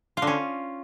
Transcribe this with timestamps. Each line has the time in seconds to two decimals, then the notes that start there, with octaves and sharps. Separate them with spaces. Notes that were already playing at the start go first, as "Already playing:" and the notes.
0.17 F4
0.22 D3
0.27 C#4